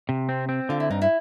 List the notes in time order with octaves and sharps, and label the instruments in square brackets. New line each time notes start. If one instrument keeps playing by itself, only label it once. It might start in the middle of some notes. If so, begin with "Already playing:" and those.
[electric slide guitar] C3
C4
C4
[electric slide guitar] D3 [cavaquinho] F4
[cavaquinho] E4
[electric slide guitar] G2 [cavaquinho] D#4
[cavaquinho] E4